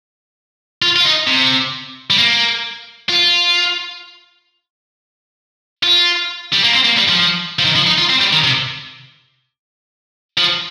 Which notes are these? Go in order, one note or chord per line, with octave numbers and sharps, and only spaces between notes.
F4
F4
D#4
C3
G3
A#3
F4
F4
G3
A#3
C4
A#3
G3
F3
F3
D#3
F3
D#4
F4
C4
G3
D#3
C3
F3